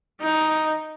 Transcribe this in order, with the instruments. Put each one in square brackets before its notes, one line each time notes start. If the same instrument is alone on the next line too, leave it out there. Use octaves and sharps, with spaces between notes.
[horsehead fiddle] D#4